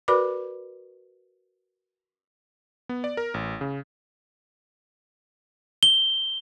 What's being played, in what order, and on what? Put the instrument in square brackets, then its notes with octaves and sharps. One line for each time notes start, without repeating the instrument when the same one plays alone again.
[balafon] F#4 A#4 B4 D5 B5 D6
[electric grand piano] B3
D5
A#4
A1
C#3
[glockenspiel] G7